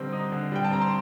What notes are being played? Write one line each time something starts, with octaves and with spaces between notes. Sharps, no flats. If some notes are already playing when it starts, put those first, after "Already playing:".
Already playing: D3 G3 C4 D#4
D#4
D3
G3 G5
A5
C4 A#5
C6